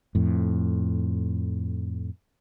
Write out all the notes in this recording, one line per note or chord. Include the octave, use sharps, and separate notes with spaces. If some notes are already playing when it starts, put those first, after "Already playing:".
F2 A2